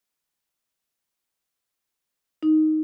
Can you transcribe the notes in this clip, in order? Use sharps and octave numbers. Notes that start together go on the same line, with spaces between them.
D#4